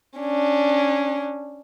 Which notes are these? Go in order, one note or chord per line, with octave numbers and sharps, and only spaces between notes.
C#4 D4